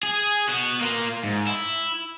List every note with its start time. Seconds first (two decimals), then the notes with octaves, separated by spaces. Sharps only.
0.03 G#4
0.49 B3 F#4
0.81 A#3 F4
1.24 G#2
1.47 E4